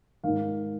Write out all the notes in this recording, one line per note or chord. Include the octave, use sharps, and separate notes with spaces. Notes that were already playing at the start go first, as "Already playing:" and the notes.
G#2 D#3 F5